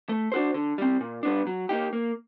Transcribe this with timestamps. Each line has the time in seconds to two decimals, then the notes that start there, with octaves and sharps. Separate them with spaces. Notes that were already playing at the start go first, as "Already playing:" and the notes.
0.09 A3
0.32 D4 F#4 A4 C5
0.54 D3
0.78 G3 C4
1.01 A#2
1.23 G3 B3 D4
1.47 F#3
1.69 A#3 D#4 G4
1.93 A#3